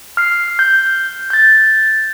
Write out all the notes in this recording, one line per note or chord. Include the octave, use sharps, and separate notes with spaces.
F6 C7
G6
G6 A6